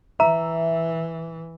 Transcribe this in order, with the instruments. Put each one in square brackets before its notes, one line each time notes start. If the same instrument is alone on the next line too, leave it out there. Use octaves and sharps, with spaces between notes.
[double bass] E3 [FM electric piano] E5 [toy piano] A#5